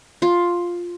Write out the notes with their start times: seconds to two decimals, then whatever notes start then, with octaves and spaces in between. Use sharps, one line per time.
0.22 F4